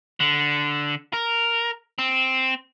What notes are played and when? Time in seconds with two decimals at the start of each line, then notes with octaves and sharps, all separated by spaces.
0.20 D3
1.13 A#4
1.99 C4